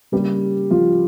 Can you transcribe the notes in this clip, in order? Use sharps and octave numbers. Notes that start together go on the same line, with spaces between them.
C#3 G3 A#3 G4
F3 F4